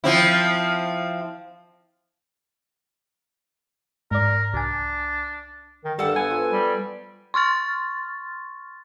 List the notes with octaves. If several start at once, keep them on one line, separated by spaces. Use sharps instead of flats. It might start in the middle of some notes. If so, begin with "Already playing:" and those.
F3 C4 E4
G#2 A#4 D5
C2 D4 G#5
D#3
G2 G3 A4 F#5
B3 G#5
F3
G3
C6 C#6 F6 A6